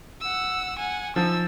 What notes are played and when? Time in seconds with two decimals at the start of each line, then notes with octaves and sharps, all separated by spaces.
0.21 F#5 E6
0.78 F#5 G#5
1.16 F3 D#4 E6